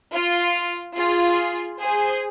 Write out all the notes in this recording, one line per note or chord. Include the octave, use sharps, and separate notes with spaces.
F4
F4 G#4
G#4 C5